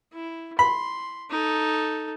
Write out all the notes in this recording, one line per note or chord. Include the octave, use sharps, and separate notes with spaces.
E4
B5 C6
D#4 A4